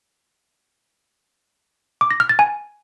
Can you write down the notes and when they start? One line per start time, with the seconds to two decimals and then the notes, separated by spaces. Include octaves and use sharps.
2.01 D6
2.11 A#6
2.20 F6
2.29 A6
2.39 G#5